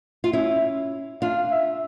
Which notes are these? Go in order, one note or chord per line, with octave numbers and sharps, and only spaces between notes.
F4
C#4 E4 E5
D4 F4 F5
E5